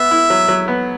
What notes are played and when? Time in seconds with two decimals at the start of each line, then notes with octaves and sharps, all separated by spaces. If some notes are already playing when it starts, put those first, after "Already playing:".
Already playing: B3 E5
0.11 E4
0.30 F#3
0.48 F#3
0.68 B3